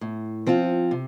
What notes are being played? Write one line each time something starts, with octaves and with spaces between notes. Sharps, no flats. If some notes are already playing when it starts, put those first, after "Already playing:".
A2
F3 C4 F4
C3